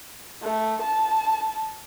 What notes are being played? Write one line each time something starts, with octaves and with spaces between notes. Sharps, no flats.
A3
A5